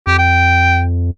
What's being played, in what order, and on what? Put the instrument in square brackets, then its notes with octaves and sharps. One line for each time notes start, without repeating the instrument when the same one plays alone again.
[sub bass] F2 [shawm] G4
[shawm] G5